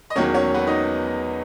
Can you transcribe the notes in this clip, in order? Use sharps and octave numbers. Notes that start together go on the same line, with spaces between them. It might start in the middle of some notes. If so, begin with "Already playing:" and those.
D#5
E1 E2 D#3 F#3 C#4 C#5
C#4 C#5
B3 B4
D#4 D#5